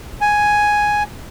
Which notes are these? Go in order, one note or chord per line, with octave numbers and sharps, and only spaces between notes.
G#5